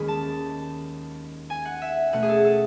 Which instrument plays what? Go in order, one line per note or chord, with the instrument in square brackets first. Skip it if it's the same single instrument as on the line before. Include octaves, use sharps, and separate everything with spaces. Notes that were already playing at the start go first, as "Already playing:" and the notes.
Already playing: [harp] D#2 D#3 G#3 C#4 B5
A5
G#5
F#5
E5
B2 A3 C#4 F#5
G#4
A4
A4